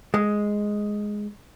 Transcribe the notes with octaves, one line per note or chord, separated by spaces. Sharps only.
G#3